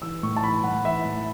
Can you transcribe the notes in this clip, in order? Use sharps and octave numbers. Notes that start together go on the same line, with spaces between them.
E3 E6
A2 C#6
A5
E3 B5
A2 F#5
E3 E5
A2